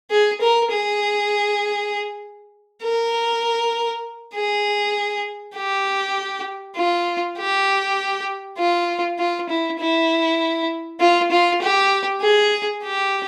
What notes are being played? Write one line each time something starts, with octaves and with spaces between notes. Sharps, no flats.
G#4
A#4
G#4
A#4
G#4
G4
F4
G4
F4
F4
E4
E4
F4
F4
G4
G#4
G4